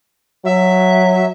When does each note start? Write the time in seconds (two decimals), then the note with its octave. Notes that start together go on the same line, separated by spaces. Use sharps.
0.45 F#3 E5